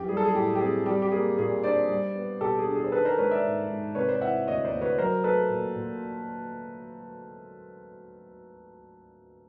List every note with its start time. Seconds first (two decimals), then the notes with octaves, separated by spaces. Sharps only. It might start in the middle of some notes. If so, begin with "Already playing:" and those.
Already playing: F#2 E3 G4
0.09 G3 G#4
0.17 A4
0.25 G#4
0.34 A2 G4
0.55 G4
0.61 C4 G#4
0.86 G3 G4
1.02 G4
1.12 A#3 G#4
1.38 A#2 G#4
1.63 D4 C5 D5
1.89 G3
2.16 B3
2.41 B2 G4 A4
2.59 G#4
2.67 D4
2.75 G#4
2.84 C5
2.92 D#3 A4 B4
3.05 A#4 C5
3.18 G#3 B4 C#5
3.31 D5 E5
3.45 G#2
3.69 G#2
3.95 C3 B4 C#5
4.09 C5 D5
4.21 E3 E5 F#5
4.47 D2 C#5 D#5
4.65 C5 D5
4.72 D2
4.81 B4 C#5
4.98 F#3 A#4 C5
5.24 A3 A4 B4
5.50 A#2
5.76 A#2